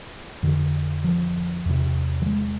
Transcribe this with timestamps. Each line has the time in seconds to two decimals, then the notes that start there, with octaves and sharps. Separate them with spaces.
0.43 F2 D3
1.04 F3
1.66 E2 C3
2.22 F3
2.26 G#3